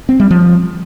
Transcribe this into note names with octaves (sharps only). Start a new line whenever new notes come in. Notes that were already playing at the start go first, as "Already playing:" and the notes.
C4
G3
F3